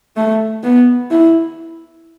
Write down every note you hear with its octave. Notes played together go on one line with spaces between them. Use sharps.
A3
B3
E4